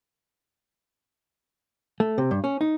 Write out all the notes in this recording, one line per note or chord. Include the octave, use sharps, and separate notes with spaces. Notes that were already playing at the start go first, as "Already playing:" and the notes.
A3
C3
G2
C#4
D#4